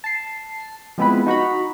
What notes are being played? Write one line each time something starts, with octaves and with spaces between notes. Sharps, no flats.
A5 C7
F3 G#3 B3 C4 E4 B4
D#4 F#4 A#5 B5